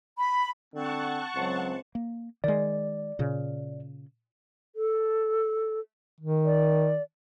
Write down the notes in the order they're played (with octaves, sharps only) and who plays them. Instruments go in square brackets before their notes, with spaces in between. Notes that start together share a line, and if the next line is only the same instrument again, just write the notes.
[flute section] B5
[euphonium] D3 [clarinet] C4 [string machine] F#5 A5 C#6
[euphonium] C#2 [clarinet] F#3 [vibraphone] C4 C5
[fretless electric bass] A#3
[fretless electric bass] D#3 G#3 [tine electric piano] D5
[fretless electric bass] A#2 C#3
[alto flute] A4
[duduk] D#3
[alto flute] D5